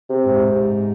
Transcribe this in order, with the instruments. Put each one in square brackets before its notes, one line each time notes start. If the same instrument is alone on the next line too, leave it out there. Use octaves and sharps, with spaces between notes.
[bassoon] C3
[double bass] G#2